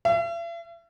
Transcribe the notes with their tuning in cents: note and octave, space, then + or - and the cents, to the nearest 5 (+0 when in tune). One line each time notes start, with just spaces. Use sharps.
E5 +45